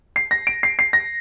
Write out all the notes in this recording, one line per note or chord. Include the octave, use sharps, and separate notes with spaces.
C7
A#6
D7
C7
C7
A#6